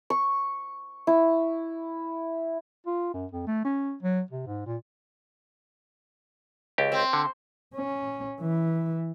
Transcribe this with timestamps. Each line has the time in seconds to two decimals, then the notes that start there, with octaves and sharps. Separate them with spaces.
0.10 C#6
1.07 E4
2.86 F4
3.14 F#2
3.32 F2
3.47 A3
3.65 C#4
4.03 F#3
4.31 C3
4.46 G#2
4.66 A#2
6.78 C#2 G4
6.92 C4
7.13 D3
7.75 C#4
8.41 E3